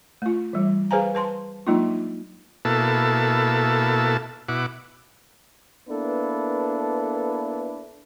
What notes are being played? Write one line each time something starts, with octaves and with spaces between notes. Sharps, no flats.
A3 F4
E3 G3
G#4 B4 C5 F5 G#5 A#5
B4 A5 C6
F#3 G#3 A#3 D4 D#4 F4
B2 A#3 E4 A4 A5
B2 E4 F#5 D6
A#3 B3 D4 E4 A4 B4